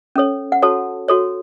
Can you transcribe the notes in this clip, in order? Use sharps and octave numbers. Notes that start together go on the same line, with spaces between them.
C#4 A4 C#5
F#5
F#4 A4 C#5 A5
F#4 A4 C#5